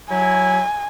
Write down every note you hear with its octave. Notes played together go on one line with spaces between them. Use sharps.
F#3 E4 G#5